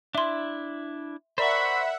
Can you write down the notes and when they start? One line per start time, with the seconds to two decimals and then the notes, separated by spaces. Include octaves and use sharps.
0.15 D4 E4 E5 C6
1.38 A#4 C5 D5 E5 F#5 A#5 B5 C#6